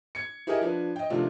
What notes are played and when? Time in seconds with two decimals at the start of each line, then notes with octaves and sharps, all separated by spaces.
0.15 G#6 C#7
0.47 E4 G4 G#4 A#4 D#5 E5
0.61 F3 D4 B4
0.96 D#5 G5
1.10 C3 D#3 F3 A3 D4 F4